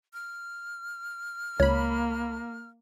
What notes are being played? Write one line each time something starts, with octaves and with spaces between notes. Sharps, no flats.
F6
C#2 A#3 C#5 B5